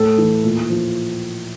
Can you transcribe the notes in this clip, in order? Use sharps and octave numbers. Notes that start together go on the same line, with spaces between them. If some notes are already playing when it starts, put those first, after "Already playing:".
Already playing: A2 A4
E3
A#2
F3